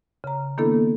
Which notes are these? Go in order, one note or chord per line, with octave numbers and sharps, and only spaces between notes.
C#3 A#5
D#3 A#3 B3 D4 E4 A4